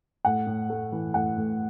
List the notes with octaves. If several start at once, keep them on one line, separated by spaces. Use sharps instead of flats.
A2 F#5
A2
A3
E3
A2 F#5
A2